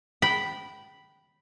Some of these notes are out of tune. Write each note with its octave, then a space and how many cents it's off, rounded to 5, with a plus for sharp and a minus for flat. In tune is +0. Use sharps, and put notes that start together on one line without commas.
G5 -20 B5 +0